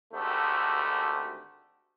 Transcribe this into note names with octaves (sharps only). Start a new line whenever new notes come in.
G#1 D2 A3 G4